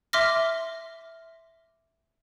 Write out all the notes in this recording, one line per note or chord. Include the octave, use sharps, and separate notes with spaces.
E5 C6 D6 F6 A#6